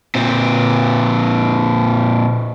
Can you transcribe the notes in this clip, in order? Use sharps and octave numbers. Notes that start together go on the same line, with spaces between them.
A#2 C4